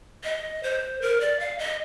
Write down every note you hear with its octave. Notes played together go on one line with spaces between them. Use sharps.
D#5
C5
A#4
D5
F5
D#5